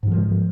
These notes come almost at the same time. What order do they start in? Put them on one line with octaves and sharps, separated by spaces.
G#2 E3 F3 G#3